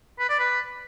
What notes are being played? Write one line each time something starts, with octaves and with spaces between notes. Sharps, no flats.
B4
D5
B4